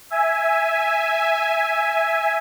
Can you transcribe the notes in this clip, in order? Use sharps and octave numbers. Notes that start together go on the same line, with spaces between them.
E5 G#5